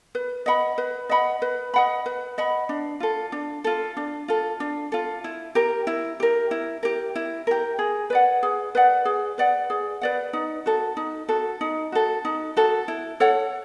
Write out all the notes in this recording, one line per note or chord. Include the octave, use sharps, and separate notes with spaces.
B4
D#5 F#5 B5
B4
D#5 F#5 B5
B4
D#5 F#5 B5
B4
D#5 F#5 B5
D4
F4 A4
D4
F4 A4
D4
F4 A4
D4
F4 A4
E4
G4 A#4
E4
G4 A#4
E4
G4 A#4
E4
G4 A#4
G#4
B4 D5 F#5
G#4
B4 D5 F#5
G#4
B4 D5 F#5
G#4
B4 D5 F#5
D#4
F#4 A4
D#4
F#4 A4
D#4
F#4 A4
D#4
F#4 A4
E4
A4 C#5 F#5